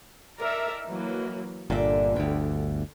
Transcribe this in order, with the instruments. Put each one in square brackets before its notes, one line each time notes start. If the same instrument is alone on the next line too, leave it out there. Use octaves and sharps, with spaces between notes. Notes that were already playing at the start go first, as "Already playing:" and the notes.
[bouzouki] A2 D#4 [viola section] A#4 D5 E5
[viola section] E3 F#3 A#3
[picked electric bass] G1 A#2 [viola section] D3 [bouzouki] D5 E5
[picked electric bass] G1 D2 [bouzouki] B4 G5